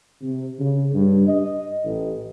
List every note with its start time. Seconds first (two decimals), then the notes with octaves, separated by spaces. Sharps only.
0.21 C3
0.58 C#3
0.94 G2
1.27 D#5
1.84 A1